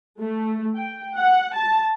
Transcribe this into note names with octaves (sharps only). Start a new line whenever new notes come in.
A3
G5
F#5
A5